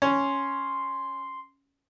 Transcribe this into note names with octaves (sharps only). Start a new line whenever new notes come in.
C#4 C6